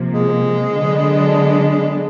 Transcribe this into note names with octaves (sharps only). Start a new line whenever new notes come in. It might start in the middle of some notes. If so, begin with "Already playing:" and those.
Already playing: C3 F3 A#3
G#3
D3 F#3 B3 D4